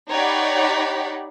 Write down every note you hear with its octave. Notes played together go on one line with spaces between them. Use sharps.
D#4 G4 C#5 D5 F#5 B5